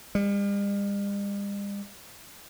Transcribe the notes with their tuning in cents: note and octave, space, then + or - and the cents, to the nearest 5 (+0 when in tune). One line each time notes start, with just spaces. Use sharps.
G3 +45